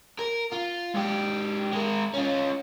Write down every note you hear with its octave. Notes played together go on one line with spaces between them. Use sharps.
A#4
F4
G#2 G4
G#3 A#4
C#4 F4